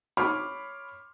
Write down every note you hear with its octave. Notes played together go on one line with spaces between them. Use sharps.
C#5 B5 C6 D6 F6